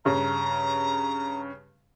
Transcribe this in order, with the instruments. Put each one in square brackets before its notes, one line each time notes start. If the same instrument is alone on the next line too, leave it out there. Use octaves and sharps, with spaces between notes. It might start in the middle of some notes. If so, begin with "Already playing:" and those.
[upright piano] G2 C#3 [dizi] A#5